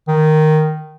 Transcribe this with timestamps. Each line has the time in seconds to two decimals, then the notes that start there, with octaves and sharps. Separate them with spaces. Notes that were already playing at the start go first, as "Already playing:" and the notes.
0.08 D#3